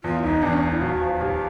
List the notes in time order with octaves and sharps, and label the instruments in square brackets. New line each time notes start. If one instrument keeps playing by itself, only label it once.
[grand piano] E2 [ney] F4
[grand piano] E1 [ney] D#4
[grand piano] E2 [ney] D4
[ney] C#4
[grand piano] E1 [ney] D4
[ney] E4
[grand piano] D#2 [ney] F#4
[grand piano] F3
[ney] F#4
[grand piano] D#2 [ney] G4